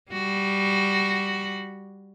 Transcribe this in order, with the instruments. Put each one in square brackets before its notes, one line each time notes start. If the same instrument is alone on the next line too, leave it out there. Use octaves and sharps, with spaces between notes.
[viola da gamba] G3 F#4